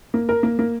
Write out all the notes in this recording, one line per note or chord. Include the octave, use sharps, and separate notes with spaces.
A#3
A#4
A#3
A#3